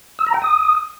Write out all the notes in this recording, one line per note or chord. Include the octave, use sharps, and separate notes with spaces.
E6
A#5
G5
D#6